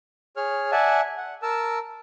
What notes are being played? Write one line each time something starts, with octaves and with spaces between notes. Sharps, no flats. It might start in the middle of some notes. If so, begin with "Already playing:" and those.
G#4 C#5 F6
D5 E5 F#5 G#5 A5
F#5
A#4 A5 E6